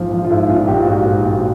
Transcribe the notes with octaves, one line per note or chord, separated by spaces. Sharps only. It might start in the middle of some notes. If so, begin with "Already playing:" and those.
Already playing: A#1 G#2 F3
F3
F4
G#2 E4
A#1 F4
A#1 G4
F4
G#2 F#4
G#2
A#1 F#4